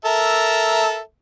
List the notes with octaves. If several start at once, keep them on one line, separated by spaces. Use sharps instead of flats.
A4 A#4 E5